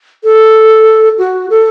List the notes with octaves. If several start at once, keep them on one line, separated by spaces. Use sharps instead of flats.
A4
F#4
A4